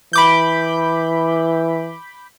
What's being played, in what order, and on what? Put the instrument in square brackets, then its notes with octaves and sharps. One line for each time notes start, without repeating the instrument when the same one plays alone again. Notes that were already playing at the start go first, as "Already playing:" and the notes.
[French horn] E3 [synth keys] B5 D6 G6